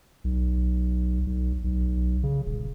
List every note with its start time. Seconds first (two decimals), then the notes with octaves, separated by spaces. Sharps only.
0.24 B1
1.27 B1
1.64 B1
2.23 C#3
2.46 D#1